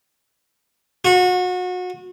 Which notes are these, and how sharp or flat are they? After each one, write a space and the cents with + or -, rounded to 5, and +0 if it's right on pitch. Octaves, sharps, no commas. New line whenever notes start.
F#4 -30